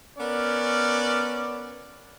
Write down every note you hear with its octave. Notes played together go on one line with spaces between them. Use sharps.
B3 C#4 A#4 D5